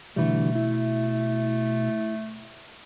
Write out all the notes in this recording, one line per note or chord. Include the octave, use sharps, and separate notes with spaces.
B2 D3 E3 G3 A3
E4